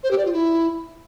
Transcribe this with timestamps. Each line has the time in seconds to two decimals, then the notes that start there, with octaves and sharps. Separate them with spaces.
0.03 C5
0.11 G4
0.18 D5
0.25 F4
0.33 E4